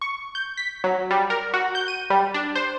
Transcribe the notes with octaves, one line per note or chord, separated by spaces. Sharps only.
C#6
G6
B6
F#3
G3
A#4
F#4
G6
D#7
G3
D4
C5